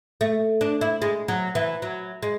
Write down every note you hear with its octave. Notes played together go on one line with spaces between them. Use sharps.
A3
D4
E4
G#3
F#3
E3
F#3
G#3